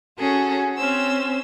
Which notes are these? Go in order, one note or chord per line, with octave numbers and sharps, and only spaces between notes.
C#4 F#4 G#4 A4
C4 C#4 C5 E6